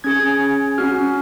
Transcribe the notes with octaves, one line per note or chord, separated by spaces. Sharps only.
C#4 G#4 G#6
C#4 F#4 F6